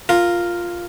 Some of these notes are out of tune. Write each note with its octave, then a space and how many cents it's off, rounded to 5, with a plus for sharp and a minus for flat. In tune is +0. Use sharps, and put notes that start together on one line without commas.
F4 +0 A#4 +0